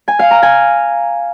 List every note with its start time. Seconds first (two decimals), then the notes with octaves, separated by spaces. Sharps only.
0.08 G#5
0.19 F5
0.31 A#5
0.42 G#5